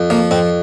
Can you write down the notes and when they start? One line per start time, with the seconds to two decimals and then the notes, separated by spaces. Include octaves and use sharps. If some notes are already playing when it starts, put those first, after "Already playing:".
Already playing: F2
0.10 F3 A#3
0.31 F2 C4